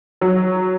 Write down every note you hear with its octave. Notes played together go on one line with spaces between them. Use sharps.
F#3